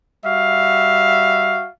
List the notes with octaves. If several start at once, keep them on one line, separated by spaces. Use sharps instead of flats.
G3 F#4 E5 F5